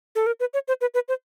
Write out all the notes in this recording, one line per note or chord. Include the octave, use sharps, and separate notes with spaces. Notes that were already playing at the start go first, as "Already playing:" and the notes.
A4
A#4
B4
C#5
C5
B4
B4
C5